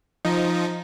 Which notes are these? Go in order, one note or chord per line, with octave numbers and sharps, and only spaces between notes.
F3 D#4